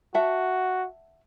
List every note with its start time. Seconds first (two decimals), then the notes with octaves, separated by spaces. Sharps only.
0.14 F#4 E5 F#5 A5